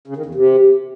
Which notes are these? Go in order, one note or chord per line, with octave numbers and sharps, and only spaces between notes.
C#3
D#3
E2
C3